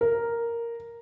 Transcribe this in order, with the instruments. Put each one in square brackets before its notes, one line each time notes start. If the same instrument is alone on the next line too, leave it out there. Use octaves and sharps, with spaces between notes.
[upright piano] A#4